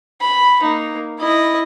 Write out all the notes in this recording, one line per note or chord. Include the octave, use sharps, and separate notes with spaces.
B5
A#3 D#4
E4 D#5